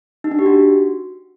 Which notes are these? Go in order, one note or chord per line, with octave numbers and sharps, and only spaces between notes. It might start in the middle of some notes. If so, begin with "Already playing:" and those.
D#4
D4
G4
F#4